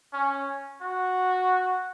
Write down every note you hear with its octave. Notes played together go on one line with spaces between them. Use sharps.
C#4
F#4